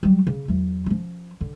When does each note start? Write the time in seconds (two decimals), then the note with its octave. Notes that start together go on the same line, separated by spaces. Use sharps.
0.03 F#3 G3
0.27 C#3
0.48 E2 F#3
0.86 F3 C#4
1.41 D3